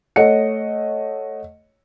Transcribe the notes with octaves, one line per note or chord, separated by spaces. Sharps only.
A3 C#5 D#5 F#5 C#7